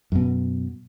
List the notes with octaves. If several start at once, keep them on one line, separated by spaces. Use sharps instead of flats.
F#2 B2